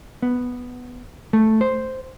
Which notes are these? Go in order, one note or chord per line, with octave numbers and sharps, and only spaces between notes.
B3
A3
C5